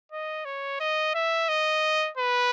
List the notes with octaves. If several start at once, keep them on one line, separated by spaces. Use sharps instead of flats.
D#5
C#5
D#5
E5
D#5
B4